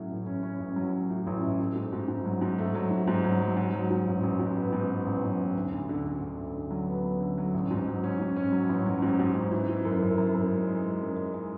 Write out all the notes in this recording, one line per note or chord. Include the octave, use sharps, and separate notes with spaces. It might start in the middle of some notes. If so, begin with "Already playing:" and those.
Already playing: A2 F#3 C#4
A1
C#4
C#4
A1
F#3
C#4
A2
A1
A2
A3
G#2
G#2
G#2
F#3
G#2
A3
F#3
G#2
G#2
F#3
F#3
G#2
F#3
G#2
A1
A1
G#2
B3
G#2
B3
A1
F#3
A1
D2
D2
D3
D3
D3
D2
D3
F#3
B3
F#3
D3
F#3
A1
G#2
F#3
C#4
G#2
C#4
F#3
A1
F#3
G#2
G#2
G#2
E3
E3
F#2
F#2
F#2
F#2
G#3
G#3
G#3
F#2
G#3
G#3